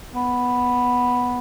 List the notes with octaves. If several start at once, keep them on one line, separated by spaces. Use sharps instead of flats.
B3